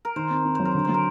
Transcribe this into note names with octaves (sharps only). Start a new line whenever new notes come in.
A#4
D#3 C5
C4
C4
F#3 C5
A#4
D3
F#3 C5
A#4